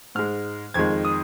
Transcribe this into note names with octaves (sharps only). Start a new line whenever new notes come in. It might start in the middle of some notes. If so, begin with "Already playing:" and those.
G#2 G#3 F6
F2 D#3 G#3 G#6
D#6